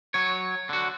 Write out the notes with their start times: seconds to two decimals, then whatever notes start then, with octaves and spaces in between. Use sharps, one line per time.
0.14 F#3 C#5
0.69 D3 F#4